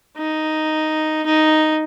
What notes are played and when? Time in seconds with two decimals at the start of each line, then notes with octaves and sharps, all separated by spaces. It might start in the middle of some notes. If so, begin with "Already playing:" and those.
0.17 D#4
1.26 D#4